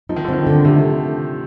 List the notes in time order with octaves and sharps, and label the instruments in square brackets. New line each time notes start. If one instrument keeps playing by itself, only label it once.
[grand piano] F3 [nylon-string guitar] D#4
[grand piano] D#3
D3
[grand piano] D#3 [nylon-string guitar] C4
[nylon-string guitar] D3
[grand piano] C3 [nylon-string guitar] A3